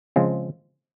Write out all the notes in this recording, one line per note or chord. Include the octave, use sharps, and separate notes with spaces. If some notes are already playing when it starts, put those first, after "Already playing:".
C#3 F3 G#3 C4